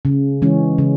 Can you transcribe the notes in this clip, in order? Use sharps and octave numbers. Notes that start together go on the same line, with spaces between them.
C#3
E3 G#3 C#4
C#3